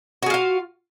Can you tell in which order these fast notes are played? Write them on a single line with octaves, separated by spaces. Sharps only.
F#4 G#4 F4 F5